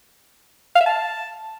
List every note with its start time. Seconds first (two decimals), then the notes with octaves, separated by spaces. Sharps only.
0.76 F5
0.81 E5
0.86 A5